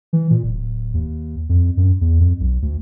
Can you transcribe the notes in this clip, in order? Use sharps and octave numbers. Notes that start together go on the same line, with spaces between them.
E3
A#2
D1
D#2
F2
F#2
E2
F2
B1
D2